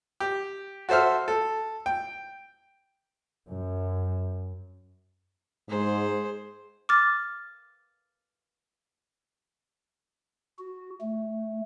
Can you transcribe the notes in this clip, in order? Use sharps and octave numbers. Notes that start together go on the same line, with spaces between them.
G4
F#4 A4 C5 E5 F6
A4
G5
F#2
G#2 G#4 C5
D6 F6 A6
F#4
A3